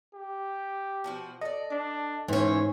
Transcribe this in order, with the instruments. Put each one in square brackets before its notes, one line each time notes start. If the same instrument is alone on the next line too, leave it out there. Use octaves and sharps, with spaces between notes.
[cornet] G4
[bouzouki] B2 F3 F#4
[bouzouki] A4 D5 [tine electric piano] D#5
[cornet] D4
[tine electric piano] G#2 [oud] E3 C#4 [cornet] C5